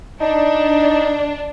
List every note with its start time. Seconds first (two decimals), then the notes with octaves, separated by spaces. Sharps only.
0.21 D4 D#4